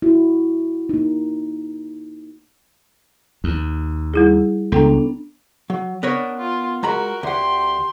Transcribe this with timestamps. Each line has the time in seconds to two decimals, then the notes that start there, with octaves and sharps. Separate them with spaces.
0.02 E4 F#4
0.89 A#3 D#4
3.44 D#2
4.14 G3 E4 G#4
4.72 C#2 B3 D4 A4 G5 A#5
5.70 F#3
6.03 B3 D4 A#4 C#5
6.38 F4
6.83 G#3 F#4 A#4 A#5 B5
7.23 D2 G4 F#5 C6